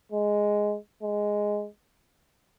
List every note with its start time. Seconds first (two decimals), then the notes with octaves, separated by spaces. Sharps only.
0.12 G#3
1.02 G#3